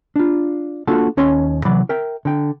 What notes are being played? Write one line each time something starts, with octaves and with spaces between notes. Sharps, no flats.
D4 F4
A#3 D4 F4 F#4 A4 A5
D#2 C#4 C#5 A5 C6
C3 E3 F#3 D5 B5
A#4 E5 G5
D3 G5